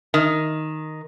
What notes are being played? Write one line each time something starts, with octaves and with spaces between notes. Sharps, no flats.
D#3